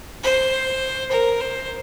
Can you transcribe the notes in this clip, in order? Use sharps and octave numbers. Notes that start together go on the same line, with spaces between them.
C5
A#4
C5